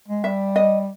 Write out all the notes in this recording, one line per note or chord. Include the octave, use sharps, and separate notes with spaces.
G#3
G3 E5
D#5